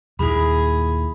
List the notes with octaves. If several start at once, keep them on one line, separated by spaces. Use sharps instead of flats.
D#2 A#2 E4 G#4 B5